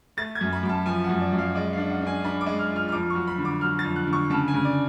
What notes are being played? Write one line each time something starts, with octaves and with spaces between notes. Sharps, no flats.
A3 A6
G#6
F#2
B5
F#2 B5
A5
F3 G#5
F#5
F#2
D5
F#2
F5
G#3 D5
F5
D4
F#5
D4 G#5
D4 B5
D6
G#3
F6
F4
F6
F6
F2 D6
C#6
F#3
B5
D3
D6
F#3 F6
A6
F2
F#6
D3
C#6
C#3 A5
G#5
C#3
D5